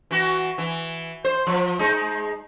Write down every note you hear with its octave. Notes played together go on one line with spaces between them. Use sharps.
E3 F#4
E3
C5
F3
G#3 D#4